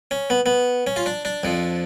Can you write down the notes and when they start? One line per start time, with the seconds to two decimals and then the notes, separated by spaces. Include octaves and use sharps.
0.11 C#4
0.30 B3
0.46 B3
0.87 C#4
0.96 F4
1.06 D4
1.25 D4
1.43 F2 F3